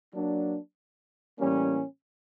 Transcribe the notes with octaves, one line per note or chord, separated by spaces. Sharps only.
F#3 A#3 D4
A2 E3 G3 A#3 C#4